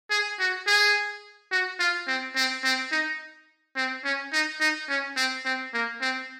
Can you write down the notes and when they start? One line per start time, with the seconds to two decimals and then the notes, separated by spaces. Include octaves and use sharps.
0.11 G#4
0.39 F#4
0.67 G#4
1.52 F#4
1.79 F4
2.08 C4
2.36 C4
2.64 C4
2.92 D#4
3.76 C4
4.05 C#4
4.33 D#4
4.60 D#4
4.89 C#4
5.17 C4
5.45 C4
5.74 A#3
6.01 C4